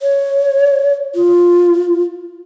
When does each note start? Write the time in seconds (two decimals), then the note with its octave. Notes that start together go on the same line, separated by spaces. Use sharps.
0.01 C#5
1.15 F4